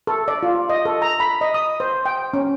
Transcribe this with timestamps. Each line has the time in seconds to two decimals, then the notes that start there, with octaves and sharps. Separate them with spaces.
0.07 A4
0.28 D5
0.43 F4
0.69 D#5
0.85 A4
1.02 A#5
1.20 B5
1.41 D#5
1.54 D#6
1.80 C5
2.06 G5
2.34 C#4